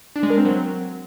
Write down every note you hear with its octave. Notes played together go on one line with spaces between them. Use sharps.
D4
G#3
A#4
C4
F#3